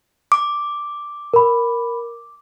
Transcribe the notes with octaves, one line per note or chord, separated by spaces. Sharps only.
D6
A#4 B5